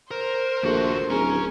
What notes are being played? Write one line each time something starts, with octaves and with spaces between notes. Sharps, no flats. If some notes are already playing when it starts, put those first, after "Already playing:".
A#4 C5
A#1 D#2 A3 F#4
D1 C#4 G#4 A#4